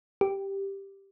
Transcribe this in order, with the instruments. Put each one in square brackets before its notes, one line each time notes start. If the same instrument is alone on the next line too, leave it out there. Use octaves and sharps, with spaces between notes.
[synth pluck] G4